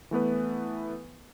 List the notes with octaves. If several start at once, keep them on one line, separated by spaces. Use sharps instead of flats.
E3 A3 B3 B4